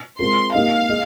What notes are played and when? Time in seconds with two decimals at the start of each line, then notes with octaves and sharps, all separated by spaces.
0.19 G#3 C4 F4 A#4 C6
0.54 A#3 D#4 G4 A#4 D#5 F5
0.89 G#4 D#5